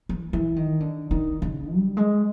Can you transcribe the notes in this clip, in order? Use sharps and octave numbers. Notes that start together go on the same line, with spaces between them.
E3
E3
D#3
D3
D#3
C#3
G3
G#3